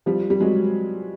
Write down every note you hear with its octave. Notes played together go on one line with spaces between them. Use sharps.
F3 G3
G3
F#3 G#3